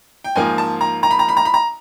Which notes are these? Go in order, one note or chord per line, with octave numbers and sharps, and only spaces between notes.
G5
G#2 F3 A#3 G#5
A5
A#5
A#5
B5
A#5
B5
A#5
B5
A#5